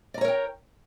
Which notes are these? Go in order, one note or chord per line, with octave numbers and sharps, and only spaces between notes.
A#4 C#5 D5 G5 A#5